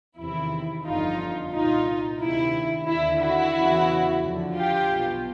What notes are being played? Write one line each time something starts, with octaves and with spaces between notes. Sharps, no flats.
E2 C3 D#3 E4
G1 F2 D3 D#4 F4
C2 A#2 D#4 F4
D2 C3 D#3 E4
D#2 D3 E4
E4 F#4
E2 C#3 E3
F2 D3
F4 G4
B1 B2